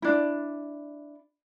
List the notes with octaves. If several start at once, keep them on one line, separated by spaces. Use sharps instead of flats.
D4 E4